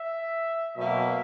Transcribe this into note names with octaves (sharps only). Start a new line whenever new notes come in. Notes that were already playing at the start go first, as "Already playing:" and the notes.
Already playing: E5
B2 F#3 A#3 E5